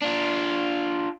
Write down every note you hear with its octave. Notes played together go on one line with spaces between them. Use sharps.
D4 F4